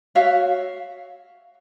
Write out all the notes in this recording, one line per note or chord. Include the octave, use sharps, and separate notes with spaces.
F#4 C#5 E5 F5